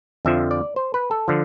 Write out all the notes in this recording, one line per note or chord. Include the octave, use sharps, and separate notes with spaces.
F2 D3 F3 E5
D5
C5
B4
A4
D3 F3